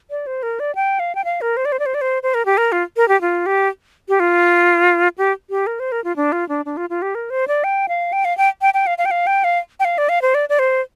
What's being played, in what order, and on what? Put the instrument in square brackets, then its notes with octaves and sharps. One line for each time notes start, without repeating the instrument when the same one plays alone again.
[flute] D5
C5
A#4
D5
G5
F5
G5
F5
A#4
C5
D5
C5
D5
C5
D5
C5
C5
A#4
G4
A#4
F4
A#4
G4
F4
G4
G4
F4
G4
G4
A#4
C5
A#4
F4
D4
F4
D4
D4
F4
F4
G4
A#4
C5
D5
G5
F5
G5
F5
G5
G5
G5
F5
F5
G5
F5
G5
F5
G5
F5
D5
F5
C5
D5
D5
C5